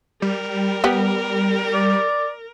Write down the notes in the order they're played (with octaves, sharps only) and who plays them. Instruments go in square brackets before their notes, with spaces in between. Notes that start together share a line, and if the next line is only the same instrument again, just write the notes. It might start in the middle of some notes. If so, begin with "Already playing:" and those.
[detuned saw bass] G3 [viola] A#4
[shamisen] B3 G4
[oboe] D5